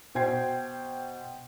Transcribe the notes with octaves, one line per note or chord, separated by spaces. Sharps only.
B2 C5 G5 G#6 C7